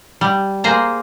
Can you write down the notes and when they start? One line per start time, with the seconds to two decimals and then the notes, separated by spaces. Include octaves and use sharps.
0.21 G3
0.64 A#3 G#4 C5 A#5